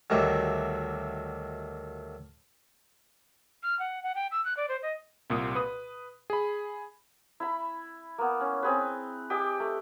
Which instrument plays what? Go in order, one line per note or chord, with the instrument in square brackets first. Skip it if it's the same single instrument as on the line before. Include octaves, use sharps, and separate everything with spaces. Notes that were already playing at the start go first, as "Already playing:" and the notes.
[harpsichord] D2 D#3 F#3 G3 E4
[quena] F6
F#5
F#5
G5
E6
F#6
D5
C5
D#5
[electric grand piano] C2 A#2 D#6
B4 D#6
G#4 B5
[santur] E4 B5
A#3 B3
C#4
C4 G#4 B4
G4 G#4 D#5 D6
A3